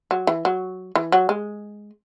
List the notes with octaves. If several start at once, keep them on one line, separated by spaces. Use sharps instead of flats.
F#3
E3
F#3
E3
F#3
G#3